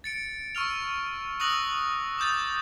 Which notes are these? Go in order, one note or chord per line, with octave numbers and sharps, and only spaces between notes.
A6 C#7 D7
C#6 E6 F6 F7
C#6 D#6 E6 F#6 A#6 F#7
D6 D#6 G6 A6